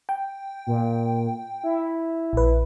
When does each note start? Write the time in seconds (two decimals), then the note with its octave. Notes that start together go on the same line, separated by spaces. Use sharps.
0.09 G5
0.67 A#2
1.63 E4
2.33 A#1 B4